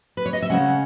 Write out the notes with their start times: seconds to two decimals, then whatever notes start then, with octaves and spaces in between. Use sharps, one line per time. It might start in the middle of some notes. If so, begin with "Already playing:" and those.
0.17 B4
0.26 C#5
0.33 D#5
0.42 E5
0.50 C#3 G#3 C#4 F#5